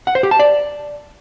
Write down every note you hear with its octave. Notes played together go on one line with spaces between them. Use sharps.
F#5
C5
G4
A5
D5